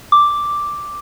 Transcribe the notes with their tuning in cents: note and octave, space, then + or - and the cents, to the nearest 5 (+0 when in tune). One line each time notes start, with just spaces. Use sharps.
D6 +0